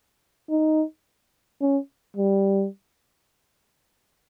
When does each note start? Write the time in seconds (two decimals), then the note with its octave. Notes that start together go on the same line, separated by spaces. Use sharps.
0.50 D#4
1.61 C#4
2.16 G3